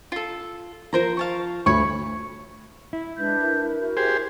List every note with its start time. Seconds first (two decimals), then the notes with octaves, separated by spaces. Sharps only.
0.12 F4 A4
0.93 F3 A#4 C5 A#5
1.17 F5 A5 C#6
1.66 D2 C#5 B5 C#6
2.93 E4
3.18 G#3 D4 B4 G6
3.41 A#4
3.78 F#4
3.97 G4 G#4 C5